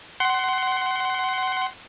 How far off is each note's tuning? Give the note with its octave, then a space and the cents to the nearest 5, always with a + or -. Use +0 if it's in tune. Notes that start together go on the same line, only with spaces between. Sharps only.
F#5 +25 C6 +0